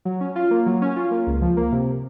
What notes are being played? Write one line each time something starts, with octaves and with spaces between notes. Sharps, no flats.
F#3
C#4
F4
A#3
F#3
C#4
F4
A#3
C#2
F3
A#3
C3